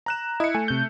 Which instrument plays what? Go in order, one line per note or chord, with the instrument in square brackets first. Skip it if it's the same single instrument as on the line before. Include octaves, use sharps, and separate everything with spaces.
[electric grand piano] A#5 F#6 E7
[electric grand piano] E4 C#7 [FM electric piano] D#5
[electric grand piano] A3 [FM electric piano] G#5
[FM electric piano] C3 G6